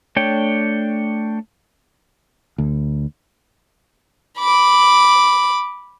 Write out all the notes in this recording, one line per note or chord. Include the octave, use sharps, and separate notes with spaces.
A3 D4 C#5 G5
D2
B5 D6